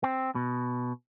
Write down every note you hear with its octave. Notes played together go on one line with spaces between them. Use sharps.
C4
B2